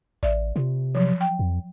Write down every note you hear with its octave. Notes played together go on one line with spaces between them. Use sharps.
A1 D5 E5
C3 F4
F3 F#3
G5
F2